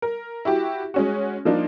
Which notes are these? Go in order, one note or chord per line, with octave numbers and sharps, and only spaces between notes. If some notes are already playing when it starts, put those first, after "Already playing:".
A#4
E4 F#4 G4
G#3 C#4 F#4
F3 A#3 D4 D#4 F4